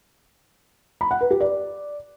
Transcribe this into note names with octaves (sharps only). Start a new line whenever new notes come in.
B5
F#5
B4
G4
D5